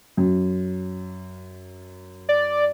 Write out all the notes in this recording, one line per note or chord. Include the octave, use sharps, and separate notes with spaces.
F#2
D5